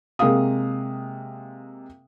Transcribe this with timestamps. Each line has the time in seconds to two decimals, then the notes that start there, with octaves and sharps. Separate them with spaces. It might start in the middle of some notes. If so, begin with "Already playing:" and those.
0.19 C3 G#3 A#3 F5 D#6